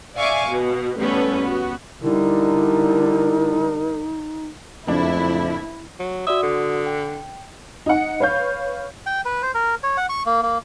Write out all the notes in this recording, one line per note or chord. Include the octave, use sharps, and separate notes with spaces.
D5 E5 F5 G#5 C#6 D6
B2 B4
A1 G3 B3 C#4 A4 B4
B3 F#4
D3 G3 D#4 E4 A#4
F#1 F2 A2 D4 E4
F#3
F#4 D5 E5 D#6
D3
G5
D#4 F#5
B4 C#5 F5 G6
G5
B4
C5
A#4
C#5
F#5
C#6
A#3
A#3